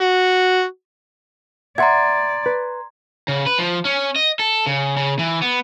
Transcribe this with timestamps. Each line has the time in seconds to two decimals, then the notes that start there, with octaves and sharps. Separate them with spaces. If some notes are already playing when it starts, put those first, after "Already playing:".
0.01 F#4
1.78 D5 E5 F#5 A#5 C6 G#6
2.46 B4
3.28 C#3
3.46 B4
3.59 F3
3.85 C#4
4.16 D#5
4.39 A4
4.67 C#3
4.97 C#3
5.19 E3
5.42 B3